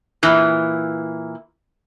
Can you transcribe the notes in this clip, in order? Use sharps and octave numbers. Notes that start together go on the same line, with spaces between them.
A#2 E3